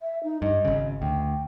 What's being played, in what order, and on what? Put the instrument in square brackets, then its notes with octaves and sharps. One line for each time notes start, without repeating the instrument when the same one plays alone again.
[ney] E5
D#4
[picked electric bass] G2 [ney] D#5
[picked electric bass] G#1 C#3
[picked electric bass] D2 [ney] G5